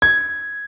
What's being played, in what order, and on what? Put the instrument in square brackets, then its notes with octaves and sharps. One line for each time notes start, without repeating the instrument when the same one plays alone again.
[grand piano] G#6